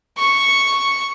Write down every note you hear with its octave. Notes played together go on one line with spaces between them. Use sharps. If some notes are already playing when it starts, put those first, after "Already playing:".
C#6